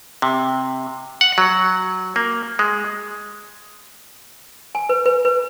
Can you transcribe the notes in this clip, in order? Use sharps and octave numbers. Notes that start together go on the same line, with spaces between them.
C3
F#5
F#3
A#3
G#3
G#5
B4
B4
B4